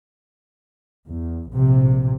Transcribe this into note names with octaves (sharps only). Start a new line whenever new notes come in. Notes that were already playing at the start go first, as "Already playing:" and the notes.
E2
A#1 C3